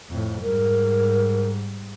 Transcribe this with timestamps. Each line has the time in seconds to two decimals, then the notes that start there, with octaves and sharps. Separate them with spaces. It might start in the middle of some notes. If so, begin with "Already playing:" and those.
0.10 F2 A2
0.43 G#2 G3 A#4